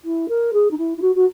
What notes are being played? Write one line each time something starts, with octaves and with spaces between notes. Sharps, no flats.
E4
A#4
G#4
D#4
E4
E4
F#4
F#4